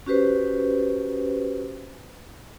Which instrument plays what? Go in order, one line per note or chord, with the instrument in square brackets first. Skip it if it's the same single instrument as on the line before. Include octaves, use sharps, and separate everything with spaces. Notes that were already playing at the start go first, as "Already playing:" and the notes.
[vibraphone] C#4 F#4 G4 B4 C5